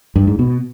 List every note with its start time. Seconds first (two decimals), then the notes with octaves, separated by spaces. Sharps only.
0.16 G2
0.27 G#2
0.39 B2